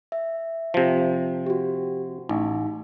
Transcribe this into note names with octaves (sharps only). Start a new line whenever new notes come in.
E5
C3 F3
F#4 G4
A1 D#4